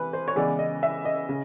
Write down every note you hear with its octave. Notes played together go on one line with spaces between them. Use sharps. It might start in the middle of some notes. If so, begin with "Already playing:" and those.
Already playing: C3 E3 B4
C5
C#5
C#3 E3 G#3 B3 D5
D#5
E5
D#5
C#3